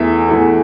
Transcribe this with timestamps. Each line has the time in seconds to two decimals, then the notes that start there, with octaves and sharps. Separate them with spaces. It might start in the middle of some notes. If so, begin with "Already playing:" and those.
Already playing: E2 E3 A3 E5
0.29 E2 E3 A3